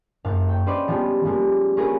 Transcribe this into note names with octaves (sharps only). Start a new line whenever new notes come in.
F#1 F#2 F5
C#5 G5
C#4 B4 C5 D5 D#5
F3 G3 G#3 B3 G4
F3 G3 G#3 A#3
C#4 F4 G#4 A#4 B4